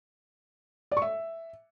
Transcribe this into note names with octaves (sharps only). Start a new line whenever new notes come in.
D5
C#6
E5